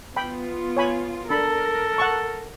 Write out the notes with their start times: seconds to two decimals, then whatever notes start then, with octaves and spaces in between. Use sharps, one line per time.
0.17 B3 F4 G5 B5
0.77 C#5 G#5 B5
1.30 D4 A4 A#4 B5
1.98 F#5 A5 C#6